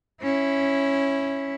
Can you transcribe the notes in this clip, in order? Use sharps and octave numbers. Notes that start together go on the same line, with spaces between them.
C#4 E4